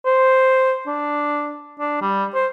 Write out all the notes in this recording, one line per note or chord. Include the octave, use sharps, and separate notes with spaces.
C5
D4
D4
G3
C5